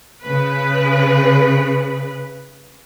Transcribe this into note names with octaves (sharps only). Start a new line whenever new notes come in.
C#3 B4